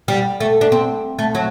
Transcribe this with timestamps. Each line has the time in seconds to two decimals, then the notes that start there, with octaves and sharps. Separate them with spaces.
0.08 G3
0.40 A3
0.61 D4
0.72 C4
1.19 A3
1.35 F#3